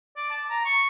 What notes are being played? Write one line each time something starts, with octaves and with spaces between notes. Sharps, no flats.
D5
A5
A#5
C#6